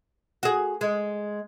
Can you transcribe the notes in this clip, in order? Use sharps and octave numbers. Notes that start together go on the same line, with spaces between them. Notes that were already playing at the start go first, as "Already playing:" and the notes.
F#4 G#4
G#3